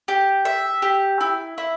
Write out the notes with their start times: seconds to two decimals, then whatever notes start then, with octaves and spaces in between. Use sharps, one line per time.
0.08 G4
0.45 E5
0.82 G4
1.21 E4
1.58 E4